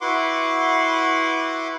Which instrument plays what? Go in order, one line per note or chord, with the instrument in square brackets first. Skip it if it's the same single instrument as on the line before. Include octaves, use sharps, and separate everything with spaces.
[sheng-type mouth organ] E4 F#4 B4 F#5 C6 D6